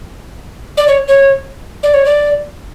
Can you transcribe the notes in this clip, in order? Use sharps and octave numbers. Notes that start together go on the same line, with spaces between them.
D5
C#5
C#5
D5
C#5
D5